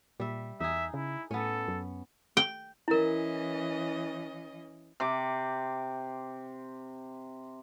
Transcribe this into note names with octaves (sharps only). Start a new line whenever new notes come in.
A#2 G3 E5
E2 D#4 G#4 E5
C#3 E4
A2 B3 C#4 A4
F#2
G5
E3 C#4 E4 A#4 D#5
C3 D6